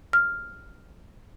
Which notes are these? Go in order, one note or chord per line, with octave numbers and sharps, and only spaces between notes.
F6